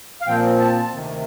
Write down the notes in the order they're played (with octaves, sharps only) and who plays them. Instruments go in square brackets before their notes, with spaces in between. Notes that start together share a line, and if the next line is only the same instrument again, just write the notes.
[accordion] F5
A#2 F3 C4 G5
A5
D2 C3 D#3